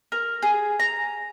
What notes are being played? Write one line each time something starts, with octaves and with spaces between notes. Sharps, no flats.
A#4
G#4
A#5